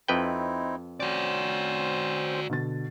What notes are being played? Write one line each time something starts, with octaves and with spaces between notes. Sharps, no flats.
F2 C4 D#4 E4 B4 G5
C4 C#4 F#4 C5 D5
B2 D3 A6